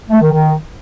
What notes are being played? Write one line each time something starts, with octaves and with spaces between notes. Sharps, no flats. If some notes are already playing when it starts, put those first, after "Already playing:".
A3
D#3
D#3